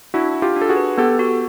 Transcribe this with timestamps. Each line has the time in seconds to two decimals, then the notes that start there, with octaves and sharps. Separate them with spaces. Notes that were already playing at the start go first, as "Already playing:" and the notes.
0.14 D4 E4 F#4
0.35 D4
0.42 F4 G4
0.56 D4
0.61 A4
0.69 F#4 G#4
0.76 B4
0.98 B3 G4 A4
1.19 F#4